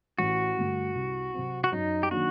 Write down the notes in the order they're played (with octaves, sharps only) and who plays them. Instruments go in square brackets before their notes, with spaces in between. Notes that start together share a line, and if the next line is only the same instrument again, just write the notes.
[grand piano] A1 [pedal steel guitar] F#4
[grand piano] G2 D3 A3
C2
C3 F#3 C4
[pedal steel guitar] F#4
[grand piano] F#2 [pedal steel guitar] D#4
[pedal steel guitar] G4
[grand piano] D#3 F#3 A#3 D4 [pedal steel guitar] F#4